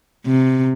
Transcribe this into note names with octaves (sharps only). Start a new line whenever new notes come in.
C3